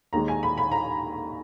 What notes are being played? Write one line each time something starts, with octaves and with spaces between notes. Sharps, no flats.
D#2 D#3 G#3 A#5
G#5
B5
B5
A#5